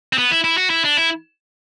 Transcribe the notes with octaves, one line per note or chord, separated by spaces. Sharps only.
C4
B3
E4
E4
F#4
E4
D4
E4